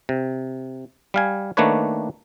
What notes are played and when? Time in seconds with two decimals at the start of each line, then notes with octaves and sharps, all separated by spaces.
0.09 C3
1.14 G3 F5 G#5
1.57 D#3 A3 A#3 D4 B4 C#5